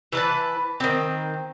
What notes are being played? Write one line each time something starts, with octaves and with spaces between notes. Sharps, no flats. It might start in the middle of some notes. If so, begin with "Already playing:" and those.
E3 B4 A5
D#3 C4